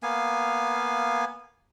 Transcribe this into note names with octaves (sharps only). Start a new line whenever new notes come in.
A#3 B3 F5 G#5